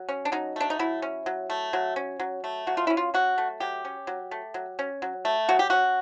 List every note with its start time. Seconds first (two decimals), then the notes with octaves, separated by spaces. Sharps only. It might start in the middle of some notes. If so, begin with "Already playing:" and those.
Already playing: F#3
0.09 C#4
0.25 D4
0.32 F#3 D#4
0.56 A3 D4
0.70 D#4
0.79 F#3 E4
1.02 C#4
1.26 F#3
1.50 A3
1.73 F#3
1.96 C#4
2.20 F#3
2.44 A3
2.67 F#3 F#4
2.77 F4
2.87 C#4 E4
2.97 F4
3.14 F#3 F#4
3.38 A3
3.60 F#3 G4
3.85 C#4
4.07 F#3
4.31 A3
4.54 F#3
4.79 C#4
5.02 F#3
5.25 A3
5.49 F#3 F#4
5.59 G4
5.70 C#4 F#4